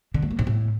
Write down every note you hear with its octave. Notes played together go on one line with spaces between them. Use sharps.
D3
A3
A#3
G#2
A2